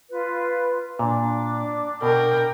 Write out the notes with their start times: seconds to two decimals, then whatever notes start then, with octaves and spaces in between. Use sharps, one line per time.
0.10 F4 B4
0.99 A#2 D4 D6
2.02 B2 A#4 G5